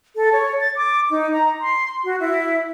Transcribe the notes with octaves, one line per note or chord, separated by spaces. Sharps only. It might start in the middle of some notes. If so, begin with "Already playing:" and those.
A4
C#5
A6
D6
D#4
A#5
C6
F#4
E4